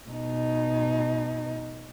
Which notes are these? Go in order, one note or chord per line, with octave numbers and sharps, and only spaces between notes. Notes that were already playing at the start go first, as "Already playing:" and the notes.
B2 D#4